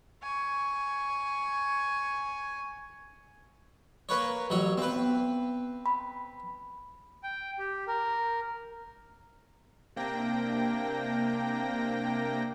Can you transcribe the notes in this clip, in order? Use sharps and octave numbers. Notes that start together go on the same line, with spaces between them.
G#5 C#6
A#3 B4 C#5
A1 F#3 C#5
B3 C4 B4
B5
G5
G4
A#4
C3 A#3 D4 G5 A#6